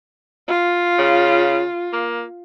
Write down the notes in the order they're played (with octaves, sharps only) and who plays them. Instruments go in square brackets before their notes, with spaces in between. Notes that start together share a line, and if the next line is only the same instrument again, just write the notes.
[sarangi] F4
[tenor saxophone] C#3
A#3